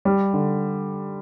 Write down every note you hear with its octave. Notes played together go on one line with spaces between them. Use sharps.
G3
D3